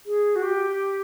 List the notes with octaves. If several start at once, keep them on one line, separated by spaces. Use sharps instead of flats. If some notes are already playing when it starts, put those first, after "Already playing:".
G#4
F#4
G4